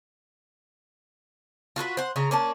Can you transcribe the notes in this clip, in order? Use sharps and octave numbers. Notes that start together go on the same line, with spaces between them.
F4 F#4 G#4 B4
C5 F#5
C#3 F4 A#5
A#3 C#4 D4 A5